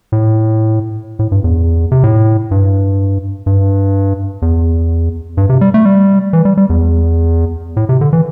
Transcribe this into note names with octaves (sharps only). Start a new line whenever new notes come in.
A2
A2
G2
E2
C3
A2
G2
G2
E2
G2
C3
G3
A3
G3
E3
G3
G3
E2
A2
C3
D3
E3